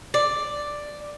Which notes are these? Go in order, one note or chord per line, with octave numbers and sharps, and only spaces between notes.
D5